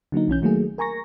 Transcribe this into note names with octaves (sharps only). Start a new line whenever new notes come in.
D3 F#3 A#3 D#4
B1 E3 C#4 G6
D#3 F#3 A3 A#3 G#4
A#4 G#5 A#5 C#6 A#6